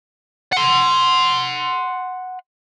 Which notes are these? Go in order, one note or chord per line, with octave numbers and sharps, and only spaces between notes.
F#5 C6